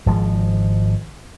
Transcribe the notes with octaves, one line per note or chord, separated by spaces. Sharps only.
G#1 F3 G#3